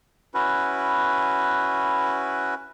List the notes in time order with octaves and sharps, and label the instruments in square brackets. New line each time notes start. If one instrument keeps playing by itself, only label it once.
[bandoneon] C#4 E4 F#4 B4